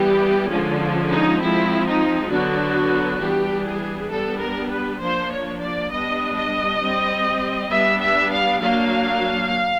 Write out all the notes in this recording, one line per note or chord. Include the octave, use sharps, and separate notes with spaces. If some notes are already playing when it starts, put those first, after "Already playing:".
Already playing: E3 G3 B3 G4
D3 F3 G#3 C#4
D#4
F3 G#3 C4 E4
D#4
D3 F#3 B3 D4 F#4
E3 G3 B3 D4 G4
G#4
G3 B3 D4 A4
A#4
B4
F3 A#3 D4 C5
C#5
D5
G3 B3 D4 D#5
D#5
G3 C4
G3 B3 D4 E5
E5
F5
F#3 A#3 D4 F5